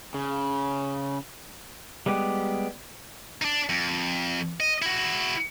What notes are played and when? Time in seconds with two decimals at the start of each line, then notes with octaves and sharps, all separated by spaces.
0.14 C#3
2.06 G3 G#3 B3 G4
3.42 D4 D#4
3.69 F2
4.60 D#5
4.82 E4 F#4